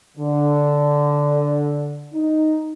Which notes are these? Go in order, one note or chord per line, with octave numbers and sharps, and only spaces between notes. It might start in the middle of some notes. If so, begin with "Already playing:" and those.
D3
D#4